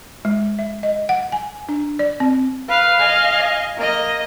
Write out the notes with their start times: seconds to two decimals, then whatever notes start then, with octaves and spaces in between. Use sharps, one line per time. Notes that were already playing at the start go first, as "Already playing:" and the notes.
0.25 G#3
0.59 E5
0.83 D#5
1.09 F#5
1.32 G#5
1.69 D4
1.99 D5
2.20 C4
2.69 B4 F5
3.00 D#5 G#5
3.77 A#3 D#5